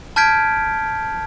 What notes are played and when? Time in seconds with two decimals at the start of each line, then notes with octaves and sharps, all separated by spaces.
0.16 A5 F6 G6 G#6 B6 D7